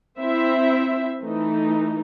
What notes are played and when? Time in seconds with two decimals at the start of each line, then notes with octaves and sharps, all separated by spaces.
0.19 C4 E4 C5 E5
1.22 E3 A3 D#4